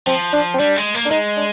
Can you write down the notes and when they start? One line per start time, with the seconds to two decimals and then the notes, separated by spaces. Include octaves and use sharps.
0.06 F3 C4
0.33 D4
0.54 C4
0.59 G3 D4
0.76 G#3
0.94 A#3
1.05 D4
1.10 G#3 D#4
1.37 D4